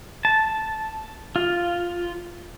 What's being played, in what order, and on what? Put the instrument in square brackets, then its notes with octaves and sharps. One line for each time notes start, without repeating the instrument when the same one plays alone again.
[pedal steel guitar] A5
F4